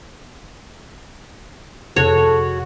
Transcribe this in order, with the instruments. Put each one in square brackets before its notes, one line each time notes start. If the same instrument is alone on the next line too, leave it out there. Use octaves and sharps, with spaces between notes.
[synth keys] F2 C3 G#4 [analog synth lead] F#4 [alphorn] A4 [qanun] C#5